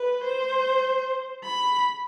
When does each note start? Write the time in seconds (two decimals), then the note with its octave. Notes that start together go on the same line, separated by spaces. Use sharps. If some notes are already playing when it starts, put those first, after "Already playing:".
Already playing: B4
0.24 C5
1.44 B5